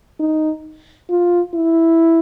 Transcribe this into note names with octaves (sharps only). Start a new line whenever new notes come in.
D#4
F4
E4